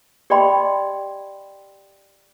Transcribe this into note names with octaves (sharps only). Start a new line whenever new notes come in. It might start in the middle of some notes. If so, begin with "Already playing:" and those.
G4 D5 D#5 G5 B5 C6